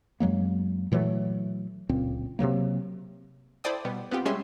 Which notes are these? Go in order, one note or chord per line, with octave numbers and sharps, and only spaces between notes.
F#2 F#3 G#3 A#3
A#2 E3 F#3 A3
D1 C#2 A#2 C4
C3 F3 F#3 A#3
E4 A4 C5 D5 G5 D#6
B2 G3 B3
B3 C4 F4 G4
G3 G#3 C#4 E5 C6